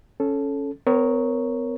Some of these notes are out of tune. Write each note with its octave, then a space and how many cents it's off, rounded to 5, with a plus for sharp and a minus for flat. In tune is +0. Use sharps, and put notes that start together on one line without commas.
C#4 +0 A4 -10
B3 +45 A#4 +0 C#5 +0